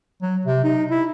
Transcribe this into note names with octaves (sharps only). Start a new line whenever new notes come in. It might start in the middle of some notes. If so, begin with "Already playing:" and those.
F#3
C3
D#4
E4